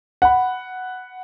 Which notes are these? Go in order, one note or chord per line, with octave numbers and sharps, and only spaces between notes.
F#5 B5